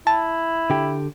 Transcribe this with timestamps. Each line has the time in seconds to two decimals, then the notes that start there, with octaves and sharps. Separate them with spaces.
0.07 E4 A5
0.70 D3 G4